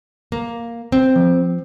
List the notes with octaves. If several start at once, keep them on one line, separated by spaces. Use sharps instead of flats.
A#3
C4
F3